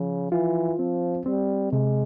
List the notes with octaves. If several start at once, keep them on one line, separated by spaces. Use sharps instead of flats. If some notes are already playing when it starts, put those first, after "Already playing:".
Already playing: C#3 F3
E3 F4
F3 C4
G3 C4
C3 G#3